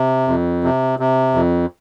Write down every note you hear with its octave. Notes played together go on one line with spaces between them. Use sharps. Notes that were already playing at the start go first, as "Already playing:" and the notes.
Already playing: C3
F2
C3
C3
F2